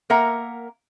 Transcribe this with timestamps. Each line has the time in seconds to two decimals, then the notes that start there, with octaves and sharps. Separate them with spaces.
0.10 A#3 A#4 E5 F#5 A#5